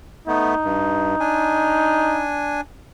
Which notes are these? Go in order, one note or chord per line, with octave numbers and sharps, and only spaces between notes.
A3 B3 D#4
G2
D4 G#5